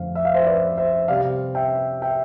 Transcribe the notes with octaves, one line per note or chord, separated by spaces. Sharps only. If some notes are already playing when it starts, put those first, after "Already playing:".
Already playing: F2 D3 A3 F5
E5
F5
C5 E5
B4 D5
C5 E5
C3 G3 C4 D5 F5
E5 G5
E5 G5